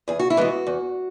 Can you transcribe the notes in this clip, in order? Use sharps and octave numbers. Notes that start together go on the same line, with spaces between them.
E2 G#4
F#4
E4
E3 G#3 B3 F#4
E2